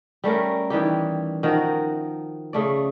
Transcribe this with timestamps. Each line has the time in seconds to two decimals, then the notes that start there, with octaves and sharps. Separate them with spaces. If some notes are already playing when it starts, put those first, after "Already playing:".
0.24 G3 A3 C#4 A#4
0.70 D#3 E3 G3 G4
1.43 D#3 F3 F#4 A#4
2.53 C#3 A3 D5